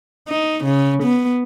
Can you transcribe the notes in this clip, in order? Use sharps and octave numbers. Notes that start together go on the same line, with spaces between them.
D#4
C#3
B3